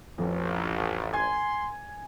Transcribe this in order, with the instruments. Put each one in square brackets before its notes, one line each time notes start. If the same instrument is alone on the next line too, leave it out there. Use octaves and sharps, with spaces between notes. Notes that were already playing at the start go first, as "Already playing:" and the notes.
[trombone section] A1 [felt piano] F2
[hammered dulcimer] G#5 [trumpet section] C6 [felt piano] G#6